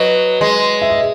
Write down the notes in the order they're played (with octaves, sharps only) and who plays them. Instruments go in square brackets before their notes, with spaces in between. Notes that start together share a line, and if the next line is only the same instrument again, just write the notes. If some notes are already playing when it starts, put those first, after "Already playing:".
Already playing: [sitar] F#3 [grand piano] B4 D#5
[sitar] G#3
[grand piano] E5
D#5